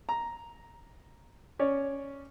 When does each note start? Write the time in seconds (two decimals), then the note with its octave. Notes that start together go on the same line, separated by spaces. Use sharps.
0.09 A#5
1.59 C#4 C#5 D5